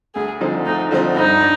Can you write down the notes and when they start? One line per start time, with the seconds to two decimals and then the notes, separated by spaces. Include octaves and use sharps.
0.15 D2 G#4
0.41 D3 F3 C4 D#4
0.66 D2 D#4
0.91 D3 F3 C4 D#4
1.16 G2 D#4
1.41 D4